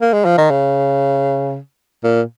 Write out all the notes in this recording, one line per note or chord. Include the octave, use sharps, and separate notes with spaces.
A#3
G#3
F3
D#3
C#3
A#2